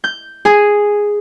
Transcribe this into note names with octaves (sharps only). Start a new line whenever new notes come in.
G6
G#4